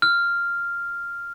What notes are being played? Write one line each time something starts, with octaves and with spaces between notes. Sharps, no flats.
F6